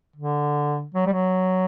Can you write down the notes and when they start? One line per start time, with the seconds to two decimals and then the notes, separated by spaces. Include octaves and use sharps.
0.16 D3
0.95 F#3
1.07 G3
1.13 F#3